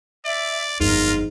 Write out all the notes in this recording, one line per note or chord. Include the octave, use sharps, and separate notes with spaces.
D5 E5
G1 F2 G#2 F4 A#4